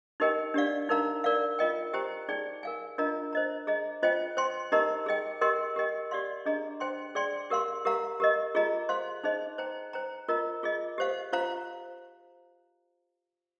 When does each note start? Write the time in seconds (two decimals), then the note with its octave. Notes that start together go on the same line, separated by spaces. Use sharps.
0.20 D#4 G4 A#4 D#5 G5
0.54 D4 G4 D5 F5
0.89 D#4 A#4 F5 A#5
1.24 A#4 D5 F5
1.59 F4 A#4 D#5 G5
1.93 G4 C5 G5 A#5
2.29 D#4 G#4 D5 G5
2.63 A#4 F5 G#5
2.98 D4 F4 A#4 D#5 A#5
3.33 C5 D#5 A#5
3.67 G#4 D#5 A#5
4.03 F4 C5 D#5 G5
4.37 C5 G5 C6
4.72 D#4 G4 A#4 D#5 A#5
5.06 G#4 D#5 G5
5.41 G4 A#4 D#5 G5 C6
5.76 G4 A#4 D#5 G5
6.11 G4 D5 F5 C6
6.46 D4 G#4 D#5 A#5
6.80 C5 G5 C6
7.15 G#4 D5 G5 C6
7.50 G4 A#4 F5 C6
7.85 G4 A#4 F5 A#5
8.20 G4 A#4 D#5
8.55 F4 G#4 D#5 A#5
8.89 C5 F5 C6
9.24 D#4 G#4 C5 D#5
9.58 C5 G5 A#5
9.93 C5 G5 A#5
10.28 F4 A#4 D#5 A#5
10.63 F4 G#4 D#5
10.98 G4 C5 F5
11.33 F4 C5 F5 A#5